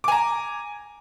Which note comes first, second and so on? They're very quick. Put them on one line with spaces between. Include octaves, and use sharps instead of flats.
D6 G#5 A#5